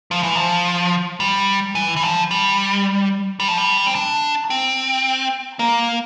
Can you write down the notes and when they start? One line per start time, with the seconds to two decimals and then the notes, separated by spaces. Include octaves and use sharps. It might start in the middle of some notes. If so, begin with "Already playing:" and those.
0.11 F3
0.23 E3
0.35 F3
1.20 G3
1.75 E3
1.96 E3
2.03 F3
2.31 G3
3.40 G3
3.48 F3
3.57 G3
3.87 C4
3.95 D4
4.50 C4
5.59 A#3